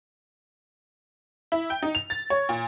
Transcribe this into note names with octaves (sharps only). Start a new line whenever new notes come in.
E4
G5
D#4
F7
A6
C#5
A#2